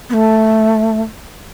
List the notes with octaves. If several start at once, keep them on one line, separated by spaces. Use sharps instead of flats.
B3
A3